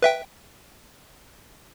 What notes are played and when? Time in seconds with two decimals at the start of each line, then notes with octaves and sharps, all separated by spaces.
0.02 B4 E5 G5